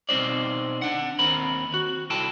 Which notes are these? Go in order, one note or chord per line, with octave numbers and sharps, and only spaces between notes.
B2 C4 D#4 C5 D5
D4 F#5
D#2 C4 A#4 B5
F#4
C2 E4 A4 G5 A5